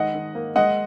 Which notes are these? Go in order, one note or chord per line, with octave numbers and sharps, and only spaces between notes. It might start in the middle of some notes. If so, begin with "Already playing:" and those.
Already playing: D#3 G#3 D#5 F#5
D#3
A#3
G#3 D#5 F#5